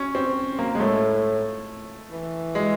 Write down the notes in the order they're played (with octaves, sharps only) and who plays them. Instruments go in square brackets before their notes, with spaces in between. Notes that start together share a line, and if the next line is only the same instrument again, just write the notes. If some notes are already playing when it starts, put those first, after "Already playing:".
Already playing: [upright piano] C#4
C4
A#3
G#3
[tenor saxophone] A2 [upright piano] A3
[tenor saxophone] E3
[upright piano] G#3